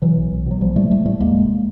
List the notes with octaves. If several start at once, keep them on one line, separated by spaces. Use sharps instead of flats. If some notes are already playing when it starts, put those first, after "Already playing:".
B2 E3 F#3
B1
B1
B2 F#3
B1 F3 G3
A2 G3 A3
A2 G3 A3
A2 G3 A3
D#2 G#3 A#3
F1